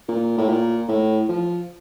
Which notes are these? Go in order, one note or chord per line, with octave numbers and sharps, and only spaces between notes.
A#2
A2
A#2
A2
F3